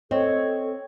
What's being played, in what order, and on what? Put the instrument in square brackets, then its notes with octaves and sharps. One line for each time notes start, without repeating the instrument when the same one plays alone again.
[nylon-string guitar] C4 [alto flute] A4 [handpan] C#5 [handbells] D#5